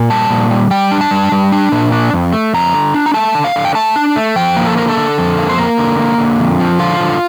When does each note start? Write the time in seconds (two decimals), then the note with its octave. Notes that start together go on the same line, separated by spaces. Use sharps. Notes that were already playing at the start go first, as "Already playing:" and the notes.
Already playing: A#2
0.10 G3 A5
0.30 A#2
0.51 G3
0.71 G3 G5
0.92 D4
1.01 A5
1.11 G3
1.32 G3
1.52 D4
1.72 A#2
1.92 D4
2.13 F2
2.33 A3
2.54 F2 A#5
2.74 D3
2.94 D4
3.06 A#5
3.14 A3 A5
3.35 D3
3.44 F5
3.55 D3
3.65 G5
3.75 A3 A5
3.96 D4
4.16 A3
4.36 F3 G5
4.56 A#3
4.67 A4
4.77 D3 A#4
4.88 A4
4.97 D3
5.18 F2
5.38 A#3
5.49 C5
5.58 A#3 A#4
5.78 D3
5.99 A#3
6.18 D3
6.39 F2
6.60 F3
6.79 D3 F4
7.00 D3